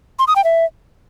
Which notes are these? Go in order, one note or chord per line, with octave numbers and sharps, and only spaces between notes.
C6
D#6
G5
E5